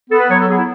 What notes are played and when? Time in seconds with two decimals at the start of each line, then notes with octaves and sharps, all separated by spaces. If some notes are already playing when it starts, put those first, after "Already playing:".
0.11 B3 A4
0.20 B4
0.30 F#3 C#5
0.39 A4
0.49 B3 G#4
0.58 E4